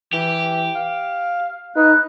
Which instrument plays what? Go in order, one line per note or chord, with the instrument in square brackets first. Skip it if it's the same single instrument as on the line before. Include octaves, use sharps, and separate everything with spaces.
[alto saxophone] E3 [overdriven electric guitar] G4
[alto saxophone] F5
[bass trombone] D#4 [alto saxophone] B4 [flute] F#6